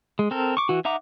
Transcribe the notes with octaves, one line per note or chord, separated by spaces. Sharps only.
G#3
C4 A4 A#4
C#6 D6
E3 F#4
D#4 E5 F#5 A#5 D6